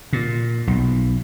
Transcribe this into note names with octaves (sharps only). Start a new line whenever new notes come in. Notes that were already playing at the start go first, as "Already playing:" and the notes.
A#2
B1